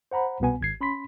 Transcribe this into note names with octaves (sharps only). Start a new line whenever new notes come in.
C5 F#5 A#5 B5
C2 B2 B3 G#5
G#1 G#6 C7
C#4 B5 C6 B6